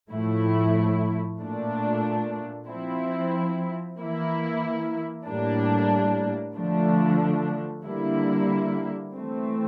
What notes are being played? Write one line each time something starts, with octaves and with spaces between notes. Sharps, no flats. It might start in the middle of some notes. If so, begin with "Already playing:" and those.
A2 F3 A3 E4
A#2 A3 D4
F3 C4 E4
E3 A#3 E4
A2 G3 A#3 D4
D3 F3 A3 D4
D3 G3 A#3 E4
E3 A3 C4